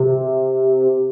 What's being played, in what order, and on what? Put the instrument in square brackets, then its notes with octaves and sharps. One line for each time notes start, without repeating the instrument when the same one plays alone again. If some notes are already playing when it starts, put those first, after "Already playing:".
Already playing: [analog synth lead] C3